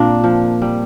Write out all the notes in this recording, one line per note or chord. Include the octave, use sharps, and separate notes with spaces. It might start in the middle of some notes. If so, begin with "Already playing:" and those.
Already playing: A#2 A#3 C4 D4
F3
G3